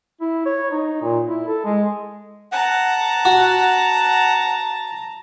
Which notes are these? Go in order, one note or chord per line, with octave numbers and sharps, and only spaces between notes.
E4
C#5
D#4
A#2
E4
A4
G#3
F#5 A5 A#5
F#4